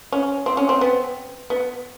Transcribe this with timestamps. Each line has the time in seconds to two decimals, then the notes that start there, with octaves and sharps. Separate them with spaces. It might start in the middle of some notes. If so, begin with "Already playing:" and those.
0.12 C#4
0.46 C4
0.57 C#4
0.69 C4
0.81 B3
1.50 B3